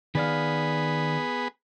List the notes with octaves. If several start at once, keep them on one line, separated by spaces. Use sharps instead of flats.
D#3 B3 G#4 D5 F5 B5